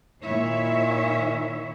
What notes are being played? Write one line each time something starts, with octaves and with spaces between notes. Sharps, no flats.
A#2 D#3 E4 C#5 E5